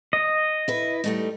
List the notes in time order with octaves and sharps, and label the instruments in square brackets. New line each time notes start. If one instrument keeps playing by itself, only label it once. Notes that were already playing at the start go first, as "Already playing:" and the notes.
[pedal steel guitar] D#5
[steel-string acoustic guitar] E4 B4
G3 A3 D#4